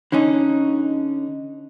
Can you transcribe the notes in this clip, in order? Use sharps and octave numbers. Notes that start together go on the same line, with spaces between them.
D3 C#4 D#4